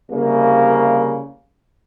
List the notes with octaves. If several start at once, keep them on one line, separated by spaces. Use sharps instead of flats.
C2 C#3 A#3